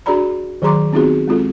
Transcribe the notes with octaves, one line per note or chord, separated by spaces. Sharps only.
D4 F#4 G#4 D5 A#5 B5
D#3 F#3 G#4 A#5 C6 D6
B3 C4 D#4 F4 F#4 G#4
G#3 C4 F4 A4